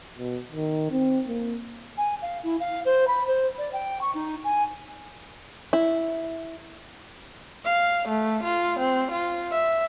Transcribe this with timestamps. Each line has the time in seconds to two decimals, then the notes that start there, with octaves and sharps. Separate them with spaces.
0.18 B2
0.52 D#3
0.92 C4
1.28 A#3
1.97 G#5
2.22 F5
2.43 E4
2.60 F5
2.85 C5
3.08 B5
3.27 C5
3.58 D5
3.73 G5
4.01 C#6
4.15 D#4
4.44 G#5
5.73 E4
7.64 F5
8.08 A3
8.44 F4
8.79 C4
9.12 F4
9.51 E5